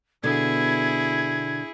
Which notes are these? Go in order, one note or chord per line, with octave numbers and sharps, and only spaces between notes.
B2 D3 E4 G#4 G#6